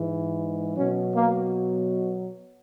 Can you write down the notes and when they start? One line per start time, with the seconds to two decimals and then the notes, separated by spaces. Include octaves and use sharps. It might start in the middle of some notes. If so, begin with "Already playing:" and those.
Already playing: G#2 E3
0.76 B2 F#3 C#4
1.15 A#3